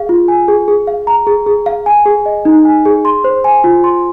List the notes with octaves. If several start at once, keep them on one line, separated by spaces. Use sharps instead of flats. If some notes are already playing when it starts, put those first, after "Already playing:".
Already playing: G#4 F5
F4
G#5
G#4
G#4
F5
A#5
G#4
G#4
F5
G#5
G#4
D#5
D#4
G#5
G#4
C6
C5
G#5
F4
C6